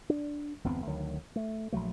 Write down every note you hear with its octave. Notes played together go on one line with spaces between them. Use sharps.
D4
G1 E2 B3 C4
D2 D#3 F#3
A3
A#1 F3 F#3 A3